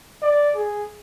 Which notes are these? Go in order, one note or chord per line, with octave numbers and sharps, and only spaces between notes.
D5
G#4